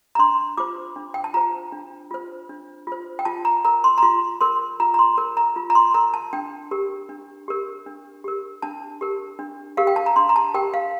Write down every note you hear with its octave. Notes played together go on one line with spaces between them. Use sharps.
A#5
D4 C6
F4 C5 D6
D4
G5
A5
F4 C5 A#5
D4
F4 C5
D4
F4 C5
G5
F4 A5
A#5
A#4 A#5
C6
A#5
F4 C6
A#4 C6
F4 A#5
A#5
C6
A#4
A#5
F4
A#5
C6
A#4 A#5
A5
D4 G5
G4 A#4
D4
G4 A#4
D4
G4 A#4
D4 A5
G4 A#4
D4
G4 A#4 F5
G5
A5
A#5
D4 C6
A#5
A5
G4 A#4 G5
F5